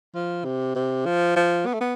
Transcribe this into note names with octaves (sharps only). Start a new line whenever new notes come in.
F3
C3
C3
F3
F3
B3
A3
B3